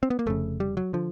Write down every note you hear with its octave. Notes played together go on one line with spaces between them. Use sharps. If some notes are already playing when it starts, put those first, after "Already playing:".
C4
B3
A#3
F1 F2 C#3 A3
G3
F#3
D3 F3